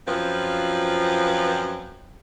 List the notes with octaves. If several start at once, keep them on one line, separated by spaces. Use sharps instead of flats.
F#2 F3 C4 F4 B4